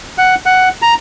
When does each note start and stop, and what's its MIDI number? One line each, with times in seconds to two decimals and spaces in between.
0.18 0.35 78
0.46 0.69 78
0.82 0.94 82